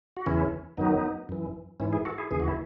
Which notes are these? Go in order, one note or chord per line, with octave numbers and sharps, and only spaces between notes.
F#4
E2 C#3 E3 C#4 E4
F#2 D#3 F#3 B3 D#4
F#2 E3
G#2 E3 C#4 E4
E4 G#4
F#4 A4
E4 G#4
D#2 C#3 E3 G#4
F#4
E4